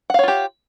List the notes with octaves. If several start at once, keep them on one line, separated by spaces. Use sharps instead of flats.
F4 G4 C#5 F5 F#5